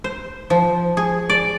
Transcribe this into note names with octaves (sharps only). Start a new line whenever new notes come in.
C5
F3
G#4
D5